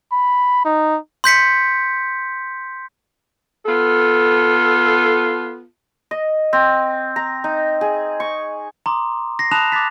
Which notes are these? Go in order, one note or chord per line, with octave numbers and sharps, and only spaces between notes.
B5
D#4
C6 G6 B6 C#7
B3 F4 A4
D#5
C4
A#5
D#4
G#4
C#6
A#5 C6 D6 D#6
A#6 C7
A5 B5 D#6 F#6 E7 F7
D6 F#6 A6 B6